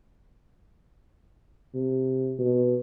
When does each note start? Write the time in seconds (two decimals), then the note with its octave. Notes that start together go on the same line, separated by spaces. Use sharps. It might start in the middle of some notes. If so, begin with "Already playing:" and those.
1.74 C3
2.39 B2